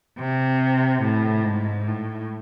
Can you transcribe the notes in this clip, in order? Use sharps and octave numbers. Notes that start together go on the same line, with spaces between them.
C3
A2
G#2
A2